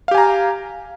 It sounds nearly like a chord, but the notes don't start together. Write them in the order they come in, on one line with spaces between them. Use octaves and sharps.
F5 G4 G#5 A#5